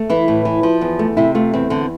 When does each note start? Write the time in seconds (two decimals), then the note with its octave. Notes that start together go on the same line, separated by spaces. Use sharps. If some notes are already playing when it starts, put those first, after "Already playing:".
Already playing: A3
0.10 E3 E4
0.28 A2
0.45 E3
0.63 F3
0.81 E2
0.99 A3
1.17 C3 E4
1.35 A3 F4
1.53 E2 C4
1.70 D3 C4